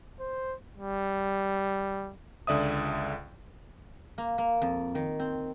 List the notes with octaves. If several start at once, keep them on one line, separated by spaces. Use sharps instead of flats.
C5
G3
C#2 D3 D5 E5 D#6
A#3
A#3
F2
D#3
C4